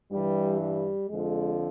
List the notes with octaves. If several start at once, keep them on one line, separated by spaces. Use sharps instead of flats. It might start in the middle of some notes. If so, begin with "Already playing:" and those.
G2 E3 G3
G3
F2 D3 F3 G#3